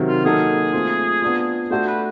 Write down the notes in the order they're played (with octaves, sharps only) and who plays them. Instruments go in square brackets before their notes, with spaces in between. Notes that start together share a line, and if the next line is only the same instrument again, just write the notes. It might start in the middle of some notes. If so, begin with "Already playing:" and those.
Already playing: [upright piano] C3 D#3 F#3
[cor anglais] F4
[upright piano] F#3 A#3 D#4 F#4 A4 [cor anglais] G#4
[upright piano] A3 C4 F4
B3 D4 F4
[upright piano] A3 D4 F#4 A4 [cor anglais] C5
[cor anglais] B4